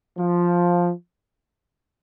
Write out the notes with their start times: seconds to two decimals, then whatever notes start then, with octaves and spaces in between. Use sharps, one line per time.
0.18 F3